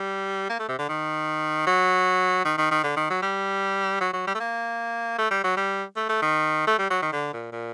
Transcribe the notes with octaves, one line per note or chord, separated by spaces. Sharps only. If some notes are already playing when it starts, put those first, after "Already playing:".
Already playing: G3
A#3
A3
C3
D3
D#3
F#3
D#3
D#3
D#3
D3
D#3
F#3
G3
F#3
F#3
G3
A3
A#3
A3
G3
F#3
G3
A3
A3
D#3
A3
G3
F#3
D#3
D3
A#2
A#2